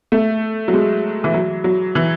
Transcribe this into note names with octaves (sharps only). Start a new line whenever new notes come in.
A3
F#3
G#3
E3
F#3
F#3
E3